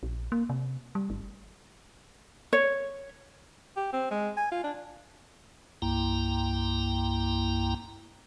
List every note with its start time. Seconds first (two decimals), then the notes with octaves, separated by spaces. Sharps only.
0.03 A#1
0.32 A#3
0.50 C3
0.95 G3
1.10 G1
2.53 C#5
3.76 G4
3.93 C4
4.11 G#3
4.37 G#5
4.52 F4
4.64 D4
5.82 C2 G2 A#3 E4 G5 A#5